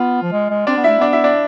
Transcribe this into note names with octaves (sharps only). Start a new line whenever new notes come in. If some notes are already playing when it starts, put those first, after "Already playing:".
Already playing: B3 F4
F3
G#3
G#3
C4 D4 D5
B3
A3 E4 E5
B3 D4 D5
E4 E5
D4 D5